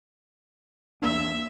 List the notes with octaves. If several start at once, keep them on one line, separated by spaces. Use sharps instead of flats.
E2 A#3 D4 E5